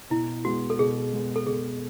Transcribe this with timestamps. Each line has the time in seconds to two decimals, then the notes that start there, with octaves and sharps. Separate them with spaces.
0.10 B2 E4
0.45 G#3 B3 F#4
0.70 A4
0.79 B2 G#4
1.13 G#3 B3
1.36 A4
1.46 B2 G#4